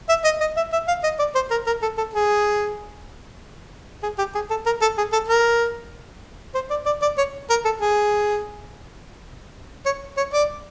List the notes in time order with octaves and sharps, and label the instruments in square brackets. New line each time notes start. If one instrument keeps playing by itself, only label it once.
[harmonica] E5
D#5
D#5
E5
E5
F5
D#5
D5
C5
A#4
A#4
A4
A4
G#4
G#4
G4
G#4
A4
A#4
A4
G#4
A4
A#4
C5
D5
D5
D5
C#5
A#4
A4
G#4
C#5
C#5
D5